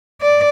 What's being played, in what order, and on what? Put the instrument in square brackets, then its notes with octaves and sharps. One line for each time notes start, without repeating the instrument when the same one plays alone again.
[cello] D5